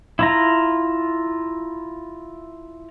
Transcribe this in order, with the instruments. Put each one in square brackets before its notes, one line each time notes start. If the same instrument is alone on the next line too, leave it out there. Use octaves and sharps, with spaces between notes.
[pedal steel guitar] E4 F4 A#5